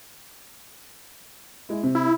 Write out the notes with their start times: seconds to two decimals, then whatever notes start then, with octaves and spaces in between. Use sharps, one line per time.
1.69 G#3 E4
1.83 C3 C4
1.95 E4